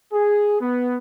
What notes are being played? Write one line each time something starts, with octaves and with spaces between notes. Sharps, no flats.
G#4
B3